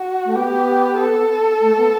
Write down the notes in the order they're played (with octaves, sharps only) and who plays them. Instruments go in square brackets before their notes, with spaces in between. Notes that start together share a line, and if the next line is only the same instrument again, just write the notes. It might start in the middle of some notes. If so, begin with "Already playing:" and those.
Already playing: [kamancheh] F#4
[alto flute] A3
[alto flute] B3 [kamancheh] G4
[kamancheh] A4
[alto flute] A3
B3